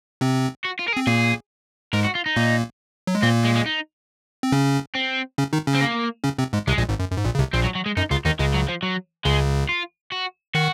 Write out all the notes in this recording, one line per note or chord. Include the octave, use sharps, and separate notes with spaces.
C3 C4
F#4
F4
A#4
G#4
C4
A#2 A#3 G#4
G#2 G#3 A#4
F#4
F4
D#4
A#2 A#3
F#3
G#3
A#2 A#3 C4
G#3
G#3
D#4
C4
C#3 C#4
C4
C#3 C#4
D#3 D#4
C#3 C#4
C4
A#3
C#3 C#4
C3 C4
G#2 G#3
C2 C3 G#3
A#1 A#2
G#1 G#2
F#2
F#2
G#2
A#1 A#2
C#3
C2 C3
A#1 A#2 C4
F#3
F#3
G#3
F#2 D#4
C#2 C#3 F4
D#2 D#3 D#4
C#2 C#3 G#3
F#3
F3
F#3
C#2 C#3 G#3
F4
F#4
D#3 F#4